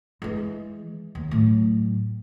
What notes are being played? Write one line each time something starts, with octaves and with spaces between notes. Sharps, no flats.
E3 G#3
D#2
A2 F#3